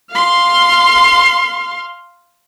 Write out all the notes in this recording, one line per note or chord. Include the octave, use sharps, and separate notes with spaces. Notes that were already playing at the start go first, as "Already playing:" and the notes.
F5 C6